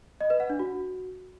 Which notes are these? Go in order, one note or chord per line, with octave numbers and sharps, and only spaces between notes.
D#5
B4
F#5
D4
F#4